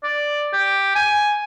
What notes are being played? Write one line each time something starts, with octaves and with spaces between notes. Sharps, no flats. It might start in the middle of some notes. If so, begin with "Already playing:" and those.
D5
G4
G#5